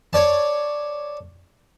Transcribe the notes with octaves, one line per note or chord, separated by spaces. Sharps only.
C#5 D5 A5